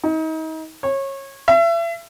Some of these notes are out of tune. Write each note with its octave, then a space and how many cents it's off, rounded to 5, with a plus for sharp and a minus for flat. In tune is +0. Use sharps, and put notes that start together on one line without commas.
D#4 +35
C#5 -25
E5 +35